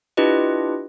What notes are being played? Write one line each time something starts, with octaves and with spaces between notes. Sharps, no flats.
D4 E4 F4 G4 B4 D#5